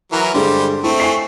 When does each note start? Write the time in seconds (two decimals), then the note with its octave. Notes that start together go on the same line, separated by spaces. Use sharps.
0.12 E3 F#3 A#4
0.34 G2 D3 G3 G#3 C5
0.84 A3 C4 E4
1.00 G#5 C#6 C7